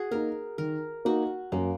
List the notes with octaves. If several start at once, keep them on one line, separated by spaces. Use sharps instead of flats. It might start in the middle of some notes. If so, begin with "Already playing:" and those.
Already playing: F#4 G#4
A#3 D#4 A#4
D#3 A#4
A#3 D#4 F#4
F#2 A#3